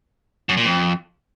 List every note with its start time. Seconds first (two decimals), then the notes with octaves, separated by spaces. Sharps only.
0.49 F#2
0.57 A#2
0.65 F2